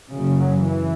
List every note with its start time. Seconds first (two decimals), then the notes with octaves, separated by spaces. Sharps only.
0.09 F#1 F#2 C#3
0.38 F#3
0.65 E3